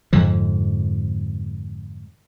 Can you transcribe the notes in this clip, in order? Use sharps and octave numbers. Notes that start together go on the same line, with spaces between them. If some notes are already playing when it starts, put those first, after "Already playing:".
F2 G#2 D3 F3